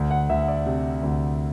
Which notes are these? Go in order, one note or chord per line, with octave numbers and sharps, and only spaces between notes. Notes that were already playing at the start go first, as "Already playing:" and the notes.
Already playing: D2
F#5
D2 E5
D5
C3
D2